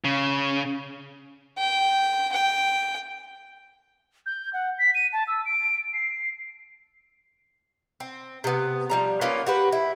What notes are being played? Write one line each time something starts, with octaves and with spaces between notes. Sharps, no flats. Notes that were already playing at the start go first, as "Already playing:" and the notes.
C#3
G5
G5
G6
F#5
B6
D#7
A5
E6
D7
C7
C4
C3 B3
F3 G3 A#5
A#3 B3 C#4 F4
F#4 G4 B4
E4